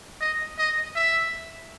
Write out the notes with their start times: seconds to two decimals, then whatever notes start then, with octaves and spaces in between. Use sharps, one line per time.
0.21 D#5
0.58 D#5
0.95 E5